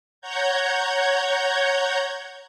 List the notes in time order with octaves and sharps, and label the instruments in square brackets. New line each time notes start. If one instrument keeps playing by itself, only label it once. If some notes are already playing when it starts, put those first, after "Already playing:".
[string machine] C#5 F#5 A#5 G6 G#6